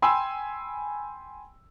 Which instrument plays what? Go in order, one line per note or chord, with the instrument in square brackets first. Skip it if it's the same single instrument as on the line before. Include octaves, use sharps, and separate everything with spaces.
[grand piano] G5 G#5 B5 C6 E6